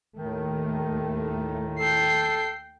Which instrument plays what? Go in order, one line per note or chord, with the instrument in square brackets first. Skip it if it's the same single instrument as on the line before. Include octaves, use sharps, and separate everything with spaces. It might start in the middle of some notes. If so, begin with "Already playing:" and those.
[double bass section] D#2 A3 [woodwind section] A2 D#3
[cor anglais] A4 [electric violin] G5 C7